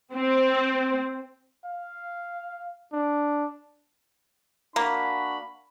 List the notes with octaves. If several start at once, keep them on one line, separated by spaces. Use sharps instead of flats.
C4
F5
D4
A#3 D4 F#4 B5